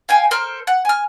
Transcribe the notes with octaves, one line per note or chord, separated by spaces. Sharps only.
F5 G5 G#5
A4 A#4 C5 F6
F#5
G#5 F6